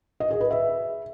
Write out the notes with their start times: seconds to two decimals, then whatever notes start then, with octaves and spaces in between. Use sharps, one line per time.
0.20 D#5
0.30 G#4
0.41 B4
0.51 E5